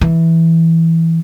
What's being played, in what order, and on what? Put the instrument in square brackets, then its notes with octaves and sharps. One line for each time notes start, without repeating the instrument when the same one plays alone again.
[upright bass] E3